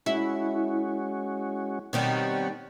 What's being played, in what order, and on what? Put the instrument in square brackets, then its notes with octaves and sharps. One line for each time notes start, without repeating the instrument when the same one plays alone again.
[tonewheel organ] G#3 C#4 F#4 [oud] E4
[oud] B2 D#3 G3 [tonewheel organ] C4 C#5 F#5